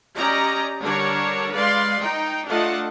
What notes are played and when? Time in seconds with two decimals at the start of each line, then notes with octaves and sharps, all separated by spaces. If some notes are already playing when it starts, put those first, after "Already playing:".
0.16 C#4 G4 D5 D#5 A#5
0.81 D3 G3 D4 A#4 C#5
1.54 G#3 B4 D5 F5 C6
2.02 D#4 G5
2.47 A3 D4 F4 D#5 F#5 A5